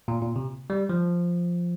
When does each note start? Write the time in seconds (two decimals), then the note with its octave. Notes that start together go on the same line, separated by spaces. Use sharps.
0.08 A#2
0.22 A#2
0.36 C3
0.70 G3
0.89 F3